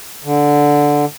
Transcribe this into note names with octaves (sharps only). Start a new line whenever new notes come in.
D3